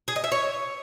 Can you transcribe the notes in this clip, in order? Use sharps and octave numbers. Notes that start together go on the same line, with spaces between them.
G#4
D#5
E5
C#5